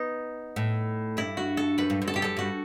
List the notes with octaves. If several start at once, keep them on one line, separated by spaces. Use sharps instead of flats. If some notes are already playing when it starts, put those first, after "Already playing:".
Already playing: B3 D#4
A2
G2 E4
F#4
A4
F#2 B4
G2
F#2
A4
G2 G4
F#2 A4
G2 F#4